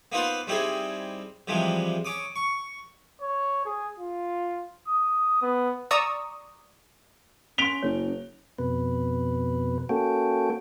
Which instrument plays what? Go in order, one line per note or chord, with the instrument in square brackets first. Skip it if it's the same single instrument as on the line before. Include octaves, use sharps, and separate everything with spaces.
[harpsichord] A#3 B3 D#4 F4 B4 C5
G3 C4 D#4 E4 G#4
C3 E3 F3 G3 G#3
C#4 D6 D#6
C#6
[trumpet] C#5
G#4
F4
D#6
B3
[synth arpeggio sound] D5 A#5 C#6 D#6 E6
[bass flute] C#4 [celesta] C6 B6 [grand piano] D7 F7 G7
[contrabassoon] F#1 [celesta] C#5
[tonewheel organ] F2 B2 B4
A#3 C#4 F#4 A4 G5